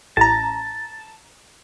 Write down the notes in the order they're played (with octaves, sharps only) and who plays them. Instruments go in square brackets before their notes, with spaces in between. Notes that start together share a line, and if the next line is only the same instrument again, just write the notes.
[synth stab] A1 A#5 [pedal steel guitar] A5